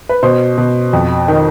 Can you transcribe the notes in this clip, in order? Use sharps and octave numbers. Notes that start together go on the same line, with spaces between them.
B4
B2 C5
B2
F2
D#3